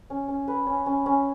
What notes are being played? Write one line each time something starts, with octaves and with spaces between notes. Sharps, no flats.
C#4
C#4
B4
C#4
C#4
C#4